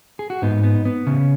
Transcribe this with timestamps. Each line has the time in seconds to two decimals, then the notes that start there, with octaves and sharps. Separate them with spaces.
0.19 G#4
0.30 F#4
0.42 G#2 B3 D#4
0.63 B3
0.85 B3
1.07 C#3 C#4